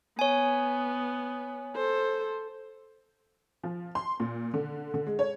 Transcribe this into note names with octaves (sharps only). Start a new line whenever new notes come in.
B3 C#5 G#5
A4 C5
F3
C6
A#2
D3
D3
G#3
C#5